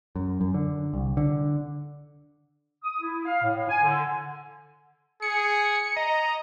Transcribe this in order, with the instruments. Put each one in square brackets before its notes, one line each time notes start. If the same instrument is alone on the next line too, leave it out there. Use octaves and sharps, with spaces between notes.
[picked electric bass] F#2
F#2
D3
C2
D3
[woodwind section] D#6
E4
F5
A2
G#5
D3
[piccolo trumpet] G#4 [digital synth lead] C#7
[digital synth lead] D#5 [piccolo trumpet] A#5